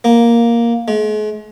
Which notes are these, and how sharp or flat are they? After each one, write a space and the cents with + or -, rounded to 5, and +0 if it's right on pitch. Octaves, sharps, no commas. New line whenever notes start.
A#3 +5
G#3 +40